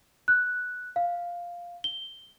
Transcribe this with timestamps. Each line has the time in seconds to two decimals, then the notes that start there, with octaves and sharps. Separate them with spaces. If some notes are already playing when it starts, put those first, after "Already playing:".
0.28 F#6
0.96 F5
1.84 G7